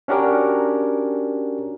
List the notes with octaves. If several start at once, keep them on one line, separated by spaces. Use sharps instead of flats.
C#4 D4 F#4 G4 A#4